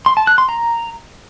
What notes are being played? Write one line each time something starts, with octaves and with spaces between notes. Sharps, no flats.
C6
A5
F#6
C6
A#5